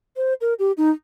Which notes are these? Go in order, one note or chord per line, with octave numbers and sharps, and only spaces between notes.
C5
A#4
G4
D#4